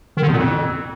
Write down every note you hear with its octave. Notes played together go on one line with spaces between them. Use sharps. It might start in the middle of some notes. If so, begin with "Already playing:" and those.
D#3
D3
E2
A#2
F2